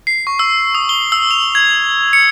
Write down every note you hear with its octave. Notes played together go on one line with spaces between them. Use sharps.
C7
C#6
E6
D#6
G7
E6
F7
G#6
C#7